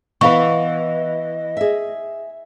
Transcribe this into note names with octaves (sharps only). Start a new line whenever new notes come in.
E3 B3 B4 D#5 F5 C#6
G#4 E5